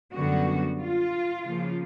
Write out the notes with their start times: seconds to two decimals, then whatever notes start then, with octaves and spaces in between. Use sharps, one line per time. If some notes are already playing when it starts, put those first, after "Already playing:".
0.14 F#2 D3 G3 B3 F#4
0.79 F4
1.43 C#3 F3 A#3